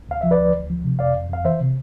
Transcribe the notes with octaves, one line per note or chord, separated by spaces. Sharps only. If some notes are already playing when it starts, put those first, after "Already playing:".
D2 F5
F3 E5
B4 D5
D2
D2
F3
C3
F2 D5 F5
F2
F2 F5
E3 C5 E5
C3